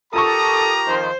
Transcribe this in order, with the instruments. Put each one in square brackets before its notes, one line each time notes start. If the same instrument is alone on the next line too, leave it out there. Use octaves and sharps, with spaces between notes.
[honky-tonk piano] F4 A5 C#6 [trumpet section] G4 A#4 A#5 [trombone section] A4 [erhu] D#6
[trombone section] F2 D#3 [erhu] C5